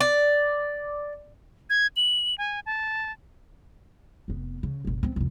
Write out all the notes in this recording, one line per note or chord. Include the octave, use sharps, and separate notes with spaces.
D5
G#6
F#7
G#5
A5
F1 B3
C#3
F#1 B1
B3 C4
C2 F2